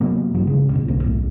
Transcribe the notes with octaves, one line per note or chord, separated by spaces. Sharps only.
C3 F#3 A#3 B3
A1 G2 E3 F#3
A1 C#3 G#3
D2 B2 D3
D1 B1 A#3 C4
D#1 B1 A2 A3